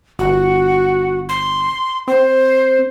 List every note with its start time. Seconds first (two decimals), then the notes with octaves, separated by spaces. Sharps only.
0.19 G1 F#4
1.29 C6
2.08 C4 C5